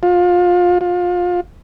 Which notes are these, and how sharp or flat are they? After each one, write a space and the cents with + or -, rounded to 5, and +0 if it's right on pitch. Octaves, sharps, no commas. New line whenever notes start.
F4 +25
F4 +25